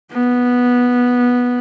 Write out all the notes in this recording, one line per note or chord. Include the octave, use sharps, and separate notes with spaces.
B3